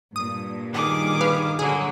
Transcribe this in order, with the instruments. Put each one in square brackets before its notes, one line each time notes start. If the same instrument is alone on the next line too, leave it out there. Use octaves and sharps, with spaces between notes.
[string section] G2 A#2 [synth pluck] D#6
[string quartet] D#3 G#4 D6
[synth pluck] B4 F5
[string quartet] D3 F#3 A#3 [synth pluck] G#4